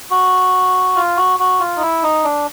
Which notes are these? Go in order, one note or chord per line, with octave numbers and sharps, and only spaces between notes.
F#4
F4
F#4
F#4
F4
D#4
E4
D#4
D4